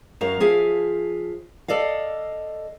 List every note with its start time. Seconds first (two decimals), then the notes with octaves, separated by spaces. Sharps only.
0.21 F#2 F#3 A#4 F5
0.40 F3 G#4 E5 F5
1.68 A4 D5 D#5 F5